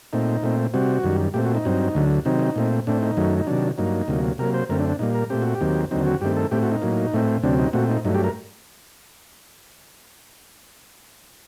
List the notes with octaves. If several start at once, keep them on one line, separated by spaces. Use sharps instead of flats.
A#2 A3 C4 D#4
A#2 A3 C4
C3 G3 C4 F#4
F#2 D#3 G3
A#2 A3 C4 G4
F#4
D#4
G2 F#3 C4
D2 D3 F#3
C3 D#3 F#3 C4 D#4
A#2 A3 C4
A2 A3 C4 D4
D#4
F#2 D#3 F#3 A3
D#4
C3 D#3 F#3 D4
G2 F#3 A#3 D#4
D2 C3 F#3 A#3
C3 F#3 A#3 A#4
C5
F#2 D3 A3 C4 A#4
D4
D4
A#2 G3 A#3 D#4
A#4
A#2 A3 C4 G4
F#4
G4
D#2 D#3 F#3 C4
D#2 D3 F#3 C4 D#4
F#4
G2 D#3 A3 C4 G4
A4
A2 A3 C4 G4
F#4
D#4
A2 F#3 A#3
A2 A3 C4
D2 C3 F#3 C4 D4
D#4
A#2 A3 C4 F#4
D#4
G2 F#3 A3 D#4
G4
A#4